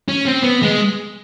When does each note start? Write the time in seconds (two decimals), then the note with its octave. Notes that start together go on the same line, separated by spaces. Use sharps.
0.09 C#4
0.26 C4
0.43 B3
0.63 G#3